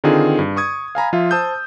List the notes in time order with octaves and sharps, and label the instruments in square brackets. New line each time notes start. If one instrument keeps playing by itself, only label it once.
[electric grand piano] D3 D#3 C4 D#4 F4 G#4
G2
C#6 D#6 G#6
F5 G#5 A#5 B5
F3 F4 E5 F5
C5 A5 D#6 E6 G6